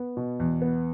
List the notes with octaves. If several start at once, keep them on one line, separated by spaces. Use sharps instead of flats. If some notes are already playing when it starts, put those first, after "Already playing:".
Already playing: B3
B2
E2
B3